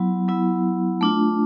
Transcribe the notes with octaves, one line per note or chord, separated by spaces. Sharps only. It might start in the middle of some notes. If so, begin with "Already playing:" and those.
Already playing: F#3 B3 E4
F#3 B3 E4
A3 D4 F4